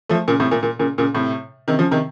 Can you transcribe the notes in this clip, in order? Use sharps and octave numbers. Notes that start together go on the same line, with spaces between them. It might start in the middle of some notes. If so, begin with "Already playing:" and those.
F3 A3
A#2 C#3
A2 C3
A#2
A#2
A#2 C#3
A#2 C#3
A2 C3
C3 D#3
C#3 F3
C3 D#3